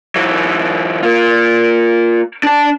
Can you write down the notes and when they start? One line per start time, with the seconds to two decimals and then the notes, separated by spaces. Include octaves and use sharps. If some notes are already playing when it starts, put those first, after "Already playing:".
0.16 E3 F#3
1.03 A#3 F4
2.43 D4 A5